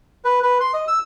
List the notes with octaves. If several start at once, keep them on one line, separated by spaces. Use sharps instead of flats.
B4
B4
C6
D#5
E6